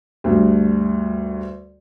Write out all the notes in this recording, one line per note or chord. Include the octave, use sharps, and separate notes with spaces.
D2 G2